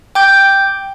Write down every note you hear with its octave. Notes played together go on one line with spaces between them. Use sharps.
G5 D6 G6